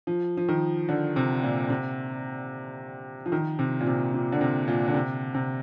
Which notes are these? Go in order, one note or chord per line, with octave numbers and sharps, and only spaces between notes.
F3
F3
D#3
D3
C3
A#2
C3
F3
D#3
C3
A#2
C3
A#2
D3
C3
A#2
D3
C3
C3